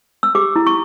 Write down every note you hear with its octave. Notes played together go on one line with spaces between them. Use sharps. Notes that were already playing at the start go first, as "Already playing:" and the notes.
E6
G4 D6
E4
C#6